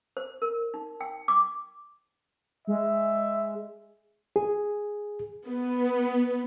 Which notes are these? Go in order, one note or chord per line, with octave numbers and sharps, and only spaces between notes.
C5
A#4
D#4
G5
D6
G#3 E5
G#4
B3